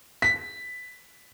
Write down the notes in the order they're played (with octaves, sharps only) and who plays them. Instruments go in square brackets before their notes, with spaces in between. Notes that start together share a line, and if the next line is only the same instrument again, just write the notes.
[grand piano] B6